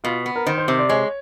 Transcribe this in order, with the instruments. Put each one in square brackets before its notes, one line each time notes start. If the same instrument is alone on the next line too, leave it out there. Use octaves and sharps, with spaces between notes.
[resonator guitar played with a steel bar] B2 [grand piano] F4
[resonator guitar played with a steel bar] B3
[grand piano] A#4
[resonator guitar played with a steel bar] D#3 [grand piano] C5
[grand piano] C5
[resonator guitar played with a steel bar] C3 [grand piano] C5
[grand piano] D5
[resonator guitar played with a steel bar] G#3 [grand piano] C#5